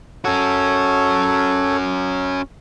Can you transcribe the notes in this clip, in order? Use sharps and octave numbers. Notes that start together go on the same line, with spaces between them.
C#4 F#4 A4 C#5